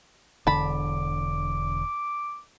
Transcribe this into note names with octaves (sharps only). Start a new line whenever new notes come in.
E1 D3 A5 B5 D6